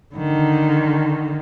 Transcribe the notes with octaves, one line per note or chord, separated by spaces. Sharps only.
D3 D#3